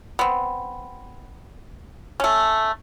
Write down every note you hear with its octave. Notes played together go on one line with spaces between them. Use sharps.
B3 C4
A3 C#4